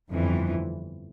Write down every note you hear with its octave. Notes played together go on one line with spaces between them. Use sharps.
G1 F2 E3